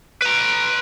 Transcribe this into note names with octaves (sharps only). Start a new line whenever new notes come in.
B4 A#5